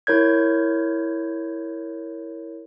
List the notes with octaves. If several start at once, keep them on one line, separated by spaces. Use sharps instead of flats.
E4 A#4 C#5 G6 G#6